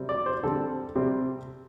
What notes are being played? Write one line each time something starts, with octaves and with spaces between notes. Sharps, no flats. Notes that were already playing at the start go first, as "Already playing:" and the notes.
Already playing: C3 G3 C4
D5
C5
D3 G3 C4 A4
C3 G3 C4